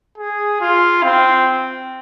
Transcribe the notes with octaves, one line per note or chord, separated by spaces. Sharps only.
G#4
F4
C4